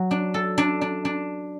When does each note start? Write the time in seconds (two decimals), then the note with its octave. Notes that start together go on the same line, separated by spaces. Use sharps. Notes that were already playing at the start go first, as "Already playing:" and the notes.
Already playing: F#3
0.11 D4
0.34 A4
0.58 D4
0.81 D4
1.05 D4